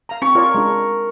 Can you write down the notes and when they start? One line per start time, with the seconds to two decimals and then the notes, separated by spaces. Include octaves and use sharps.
0.09 F5 A#5
0.22 C4 C#6
0.35 F4 A#4 C#5 D5
0.55 G#3 D4